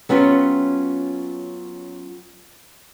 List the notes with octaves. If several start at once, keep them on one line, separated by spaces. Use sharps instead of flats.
F#3 B3 C#4 F4 G4